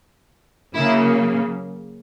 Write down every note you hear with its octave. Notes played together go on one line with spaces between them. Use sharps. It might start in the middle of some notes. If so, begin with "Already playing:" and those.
C#3 F#3 A#3 E4